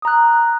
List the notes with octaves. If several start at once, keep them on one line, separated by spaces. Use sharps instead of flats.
A#5 D#6 F#6